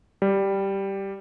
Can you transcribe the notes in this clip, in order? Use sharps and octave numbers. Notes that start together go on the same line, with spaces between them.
G3